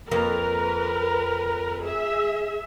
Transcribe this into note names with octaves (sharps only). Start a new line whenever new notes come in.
F2 A#3 A#4 B4
G#4 E5